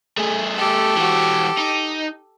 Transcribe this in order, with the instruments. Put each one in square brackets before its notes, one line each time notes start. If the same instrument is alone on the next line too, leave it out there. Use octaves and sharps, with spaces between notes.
[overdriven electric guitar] A3 G#4
[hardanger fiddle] G4 A4
[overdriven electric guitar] E3 F#4
D#4